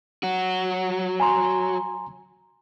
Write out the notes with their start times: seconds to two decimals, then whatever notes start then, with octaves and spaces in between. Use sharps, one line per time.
0.23 F#3 F#4
1.20 G#5 A#5 C6